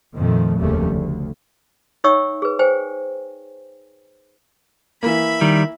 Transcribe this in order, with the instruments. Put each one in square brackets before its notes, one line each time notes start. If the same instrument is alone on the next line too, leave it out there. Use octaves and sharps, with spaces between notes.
[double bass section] F2 A#2 D#3 F3 A3
F1 D#2 C#3 G3 A3
D2
[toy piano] D#4 C#5 E5 G5 C#6 E6
G#4 B4
C5 G5 G#5
[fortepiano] E3 A#3 [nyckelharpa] E5 B5
[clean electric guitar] D#3 G3